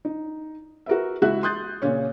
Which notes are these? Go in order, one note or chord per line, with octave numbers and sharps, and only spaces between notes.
D#4
F#4 A#4 B4 E5
C#2 E4 F#4 E5 F#6
C6 D#6 F#6 G6 A6
A#2 C#3 C#4 C#5